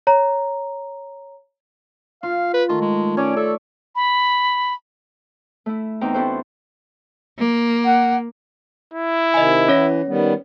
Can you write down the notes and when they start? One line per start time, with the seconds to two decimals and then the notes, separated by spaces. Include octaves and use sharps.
0.07 C#5 A#5
2.23 F4 F5
2.54 B4
2.69 D#3 A3 F4
2.81 G#3
3.17 C#4 C#5 D5
3.36 A4 E5
3.96 B5
5.66 A3 E4
6.01 E2 C4 D#4 G5 A#5
6.14 C4 D4 E4 F#4 A4 C5
7.39 A#3
7.85 F#5
8.93 E4
9.34 C3 D#3 D#5 G#5
9.68 E3 C#4 C#5 A#6
10.07 D#3 G3 B3